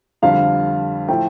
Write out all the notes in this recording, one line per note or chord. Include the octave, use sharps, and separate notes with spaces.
F2 D3 G3 F5
A2 F3 A3 G5